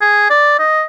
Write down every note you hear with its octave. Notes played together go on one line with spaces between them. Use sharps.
G#4
D5
D#5